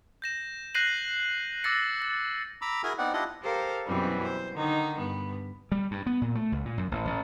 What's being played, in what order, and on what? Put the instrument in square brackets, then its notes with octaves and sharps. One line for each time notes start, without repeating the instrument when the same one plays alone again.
[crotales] G6 A#6 E7
F#6 G6 A#6 C7 D#7 F#7
D6 E6 A6 A#6 C#7
A6
[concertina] A#5 B5 D6 E6
E4 F#4 G#4 A#4 G#5
B3 C4 D#4 D5 F#5
D4 E4 F4 G4 D#5 F#5
[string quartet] G4 A4 A#4 C5 F5
F#2 B2 E3 G3 C4
C5
D3 D#3 D#4
G2 B3
[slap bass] G3
G2
B3
A#2
A3
C#2
A#2
F#2
A1
A1